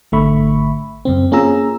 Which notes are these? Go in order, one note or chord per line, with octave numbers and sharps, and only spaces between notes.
G#1 D3 A3 E5 B5 C#6
F#2 C#3 C4
A#3 C#4 F4 G#4 A#5 E6